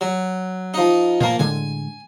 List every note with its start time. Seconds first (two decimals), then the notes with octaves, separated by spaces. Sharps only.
0.01 F#3
0.74 F3 D#4
1.20 A#2 F3 A#3
1.39 A2 D3 G#3 G#5